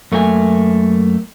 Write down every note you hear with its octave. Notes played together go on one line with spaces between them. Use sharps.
F#2 A3 A#3 F4 G#5